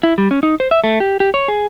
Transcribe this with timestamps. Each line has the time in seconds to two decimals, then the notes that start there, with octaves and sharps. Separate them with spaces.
0.03 E4
0.18 G3
0.31 C#4
0.43 D#4
0.60 C5
0.71 E5
0.84 A3
1.00 G4
1.20 G4
1.34 C#5
1.48 G#4